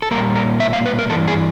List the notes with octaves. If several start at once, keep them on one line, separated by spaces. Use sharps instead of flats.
A4
A#2 G3 A#3 A#4
A#4
E5
F5
B4
A#4
G2 E3 A4
G#4